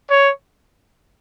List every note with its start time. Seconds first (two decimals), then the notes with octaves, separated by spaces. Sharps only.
0.08 C#5